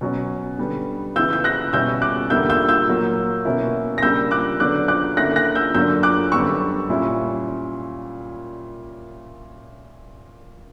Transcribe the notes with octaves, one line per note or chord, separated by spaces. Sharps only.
B2 F#3 C#4
D3 G3 B3
C#3 E3 B3 E4 E6 G6
G6
F#6 A#6
B2 G3 C#4 E4 E6 G6
D6 F#6
E2 D3 G3 A#3 E4 E6 G6
E6 G6
E6 G6
A#2 F#3 A#3
B2 A#3 C#4 E4
A#6
C#3 G3 A#3 D4 E6 G6
D6 F#6
D3 F#3 B3 D4 D6 F#6
D6 F#6
D3 A#3 C#4 E4 F#6 A#6
F#6 A#6
E6 G6
F#2 D3 F#3 A#3 D4 E6 G6
D6 F#6
F#2 D3 G3 B3 C#6 E6
A#2 G3 C#4 E4